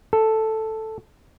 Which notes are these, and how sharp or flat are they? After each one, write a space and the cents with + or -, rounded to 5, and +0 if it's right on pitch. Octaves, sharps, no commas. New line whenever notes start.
A4 +0